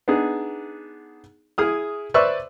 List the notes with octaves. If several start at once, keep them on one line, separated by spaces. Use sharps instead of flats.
B3 D4 D#4 G#4
E4 G#4 D#6 F6
B4 C5 D5 E5 C#6 E6